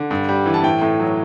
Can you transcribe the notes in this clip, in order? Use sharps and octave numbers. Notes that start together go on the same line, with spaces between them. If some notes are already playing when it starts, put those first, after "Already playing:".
Already playing: D3
G2
G3
E3
A5
A2 G5
A2
F#3